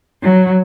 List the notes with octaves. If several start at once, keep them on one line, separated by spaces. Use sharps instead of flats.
F#3